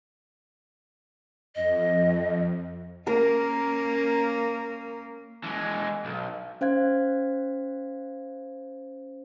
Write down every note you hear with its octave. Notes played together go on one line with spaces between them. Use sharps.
F2 D#5
A#3 C#4 A#4 A#5
E3 G#3
B1
C#4 C5 F5 G#6